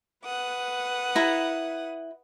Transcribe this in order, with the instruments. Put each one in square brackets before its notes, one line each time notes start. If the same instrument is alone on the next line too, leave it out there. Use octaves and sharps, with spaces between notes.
[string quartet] B4 F#5 D#6
[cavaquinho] E4 A#5